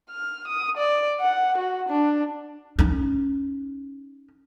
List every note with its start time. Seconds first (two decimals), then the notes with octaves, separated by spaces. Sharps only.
0.11 F6
0.47 D#6
0.77 D5
1.20 F#5
1.57 F#4
1.89 D4
2.79 C#4 D#4